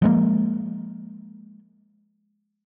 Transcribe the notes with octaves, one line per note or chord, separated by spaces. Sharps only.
F3 G#3 A#3